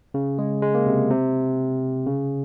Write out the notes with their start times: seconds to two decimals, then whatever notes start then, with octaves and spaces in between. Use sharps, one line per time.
0.14 C#3
0.39 G#3
0.62 G#3
0.75 A#3
0.87 C3
1.11 C3
2.07 C#3